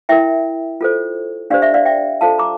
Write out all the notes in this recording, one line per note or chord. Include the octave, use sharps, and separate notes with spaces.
E4 A#4 E5 G5
F4 A4 C5
D4 G4 C5 D5 F5
E5
D5 F5
E5 G5
F4 A4 C5 F5 A5
A#5 D6